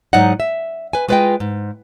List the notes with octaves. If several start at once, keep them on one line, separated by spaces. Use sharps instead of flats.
G#2 F#3 D#4 D5 D#5 F#5
E5
B4 G#5
G#3 F4 B4 C#5 D#5 G5
G#2